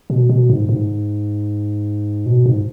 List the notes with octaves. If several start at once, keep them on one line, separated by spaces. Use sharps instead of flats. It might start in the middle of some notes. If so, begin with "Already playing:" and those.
B2
B2
G#2
G#2
B2
G#2